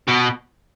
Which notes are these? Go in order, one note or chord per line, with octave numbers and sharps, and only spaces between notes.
B2